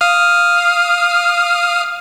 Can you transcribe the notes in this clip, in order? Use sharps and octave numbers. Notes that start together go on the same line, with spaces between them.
F5 D#6 F6